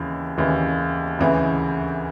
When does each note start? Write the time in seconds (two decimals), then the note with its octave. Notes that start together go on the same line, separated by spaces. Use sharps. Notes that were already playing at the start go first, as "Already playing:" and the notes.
Already playing: D#2 C#3 E3
0.38 D#2 C#3 E3
1.19 D2 C#3 E3